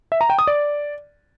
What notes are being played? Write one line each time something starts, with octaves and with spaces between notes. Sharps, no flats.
E5
A#5
G5
D#6
D5